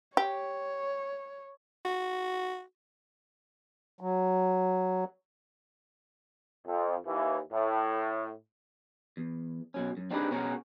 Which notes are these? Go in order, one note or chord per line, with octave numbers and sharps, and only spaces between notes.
G4 C#5
F#4
F#3
F2
D#2 E3
A2
E2
B2 F#3 C#4
F#2
C4 D4 D#4 G4 G#4 B4
B2 C#4 F#4 G#4 A#4